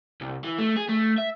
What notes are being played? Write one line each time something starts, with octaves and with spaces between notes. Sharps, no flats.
C2
E3
A3
G#4
A3
E5